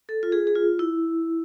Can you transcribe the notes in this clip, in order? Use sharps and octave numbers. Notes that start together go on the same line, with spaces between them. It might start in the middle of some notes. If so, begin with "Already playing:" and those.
A4
F4
G#4
G#4
F4
E4